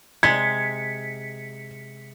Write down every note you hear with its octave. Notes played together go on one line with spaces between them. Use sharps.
C3 G#3 G#6 B6 C#7